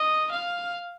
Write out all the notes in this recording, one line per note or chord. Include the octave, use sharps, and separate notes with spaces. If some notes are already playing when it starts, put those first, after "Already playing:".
Already playing: D#5
F5